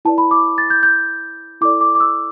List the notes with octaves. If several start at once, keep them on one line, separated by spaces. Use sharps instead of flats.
E4 B4 D5 A5
B5
D6
A6
G6
G6
E4 A4 D5 D6
D6
D6
E6